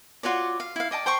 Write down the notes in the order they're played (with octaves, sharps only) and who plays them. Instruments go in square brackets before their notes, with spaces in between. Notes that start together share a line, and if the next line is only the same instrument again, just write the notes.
[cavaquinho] F4 F#4 C#5 D5
F5
E4 F5
D5 D#5 G5 A5
C5 G5 C6 C#6